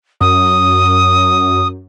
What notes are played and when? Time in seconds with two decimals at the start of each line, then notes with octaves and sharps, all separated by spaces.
0.21 F#2 D#6